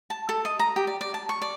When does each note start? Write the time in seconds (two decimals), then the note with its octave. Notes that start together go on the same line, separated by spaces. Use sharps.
0.10 A5
0.29 A4
0.45 D#5
0.59 A#5
0.76 G4
0.87 D5
1.01 D5
1.14 A5
1.29 C#6
1.42 D5